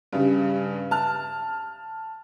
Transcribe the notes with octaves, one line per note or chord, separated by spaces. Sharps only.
G2 C#3 G3
A5 F6